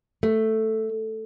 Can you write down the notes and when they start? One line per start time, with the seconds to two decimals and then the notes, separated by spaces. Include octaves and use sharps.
0.23 A3